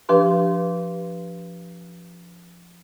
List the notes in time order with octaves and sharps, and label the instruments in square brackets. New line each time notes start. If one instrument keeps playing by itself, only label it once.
[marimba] F3 D4 G4 B4 C6